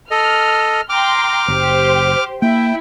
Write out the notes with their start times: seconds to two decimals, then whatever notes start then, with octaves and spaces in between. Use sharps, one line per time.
0.11 A4 D#5 F6
0.89 G5 A#5 C6 D6 F6
1.48 F#1 G4 C5
2.42 A#3 E4 G5